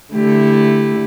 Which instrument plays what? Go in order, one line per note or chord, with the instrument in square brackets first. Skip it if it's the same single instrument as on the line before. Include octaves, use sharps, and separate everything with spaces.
[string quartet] D3 A3 E4 G4